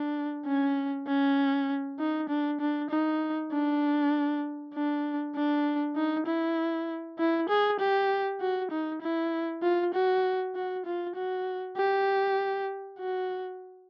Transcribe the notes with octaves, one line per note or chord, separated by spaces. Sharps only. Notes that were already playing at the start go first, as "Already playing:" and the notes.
Already playing: D4
C#4
C#4
D#4
D4
D4
D#4
D4
D4
D4
D#4
E4
E4
G#4
G4
F#4
D#4
E4
F4
F#4
F#4
F4
F#4
G4
F#4